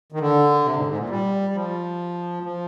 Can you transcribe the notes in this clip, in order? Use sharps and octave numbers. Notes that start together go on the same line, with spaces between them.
D#3
D3
C3
G#2
G#2
A#2
G3
F3
F3